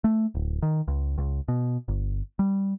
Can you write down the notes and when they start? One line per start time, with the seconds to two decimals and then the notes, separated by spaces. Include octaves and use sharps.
0.04 A3
0.35 D1
0.62 D#3
0.88 C#2
1.18 C#2
1.48 B2
1.88 G1
2.39 G3